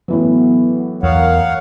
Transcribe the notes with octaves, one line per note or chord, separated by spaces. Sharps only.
A2 E3 F#3 B3
E2 A#4 C#5 F5 F#5